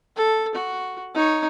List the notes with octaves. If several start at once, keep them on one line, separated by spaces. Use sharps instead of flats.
A4
F#4
D#4 C#5